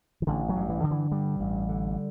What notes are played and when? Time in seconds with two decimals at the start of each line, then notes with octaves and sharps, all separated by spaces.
0.22 E3
0.27 A1 D3
0.49 F#3
0.56 G2
0.69 E3
0.84 D3
0.91 E3
1.12 G2 G3
1.40 A1
1.69 D3